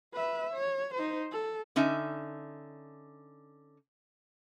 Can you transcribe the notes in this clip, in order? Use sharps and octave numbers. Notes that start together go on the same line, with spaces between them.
B4 E5
C#5
D#4 C5
A4
D3 C#4 D#4 E5